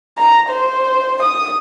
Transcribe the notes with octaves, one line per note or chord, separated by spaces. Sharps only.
A#5
C5
D#6